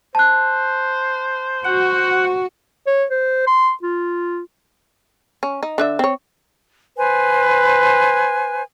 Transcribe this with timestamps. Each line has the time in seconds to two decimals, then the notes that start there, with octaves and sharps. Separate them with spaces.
0.15 C5 A5 F#6
1.65 F#4 F#5
2.87 C#5
3.11 C5
3.47 C6
3.83 F4
5.43 C#4
5.63 D#4
5.78 D3 D4 E5
5.99 C4 C#5
6.97 B4 C5 G#5